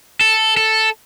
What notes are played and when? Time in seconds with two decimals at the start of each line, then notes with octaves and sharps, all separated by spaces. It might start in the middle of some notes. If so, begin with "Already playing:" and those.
0.21 A4
0.57 A4